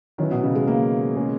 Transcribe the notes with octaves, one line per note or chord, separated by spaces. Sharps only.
D#3 F#3 C#4 E4 B4
B2
C#3
G#3
A#3
G#3 C#4 G#4